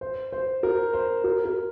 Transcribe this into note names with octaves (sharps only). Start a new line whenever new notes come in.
C5
C5
A#4
C5
A#4
A#4